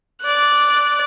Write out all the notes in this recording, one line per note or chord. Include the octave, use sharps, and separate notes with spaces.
D5 F#6